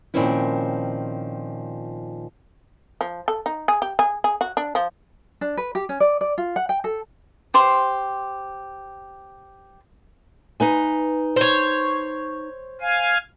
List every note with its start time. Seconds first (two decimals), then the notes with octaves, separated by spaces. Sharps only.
0.14 A#2 D#3 F3 C4 C#4 E4
3.01 F3
3.28 A4
3.46 D#4
3.68 G#4
3.82 G4
3.99 G#4
4.24 G#4
4.41 F#4
4.57 D4
4.75 F3
5.41 D4
5.57 B4
5.75 G4
5.89 C#4
6.00 D5
6.21 D5
6.38 F4
6.56 F#5
6.69 G5
6.84 A4
7.54 G4 C5 C6
10.60 D#4 B4 G#5
11.36 C5 C#5
12.81 F5 G#5